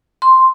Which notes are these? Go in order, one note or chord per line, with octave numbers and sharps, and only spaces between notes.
C6